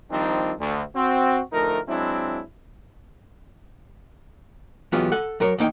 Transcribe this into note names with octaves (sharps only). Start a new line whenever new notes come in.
D#3 F3 G3 C4 D4 D#4
D2
C4 F#4
D2 F3 A3 D#4 A#4
F#3 G#3 C4 D4 E4
E3 F#3 G#3 B3 F4 G4
A4 F#5
F#3 A#4 C#5
E2 A#3 D#4 G5